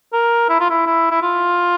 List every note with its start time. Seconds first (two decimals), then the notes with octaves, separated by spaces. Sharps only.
0.13 A#4
0.49 E4
0.60 F4
0.70 E4
0.86 E4
1.11 E4
1.22 F4